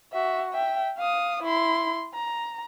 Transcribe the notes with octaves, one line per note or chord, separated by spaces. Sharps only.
F#4 E5
E5 G5
F5 D#6
E4 C6
A#5